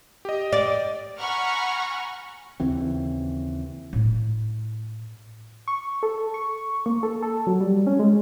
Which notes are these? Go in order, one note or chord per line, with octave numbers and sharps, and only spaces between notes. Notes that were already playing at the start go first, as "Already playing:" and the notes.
G4 D#5
D5
F#5 G#5 A#5 B5 C#6 F6
D#2 C#3 E3 C4
A2 E4
C#6
A4
C#6
A#3
A4
A4
F#3
G3
C#4
G#3